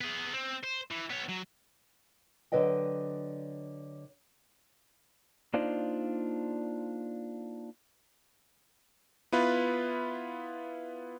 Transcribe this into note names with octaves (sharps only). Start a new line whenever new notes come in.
B3 G#4
C4
C5
E3
B3 C#5
F#3
D3 F#3 B4 D#5 G5
A#3 D4 D#4 F4 C5 D5
B3 E4 F4 B4